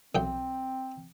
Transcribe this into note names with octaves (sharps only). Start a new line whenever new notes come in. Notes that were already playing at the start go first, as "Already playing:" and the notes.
B1 C4 G5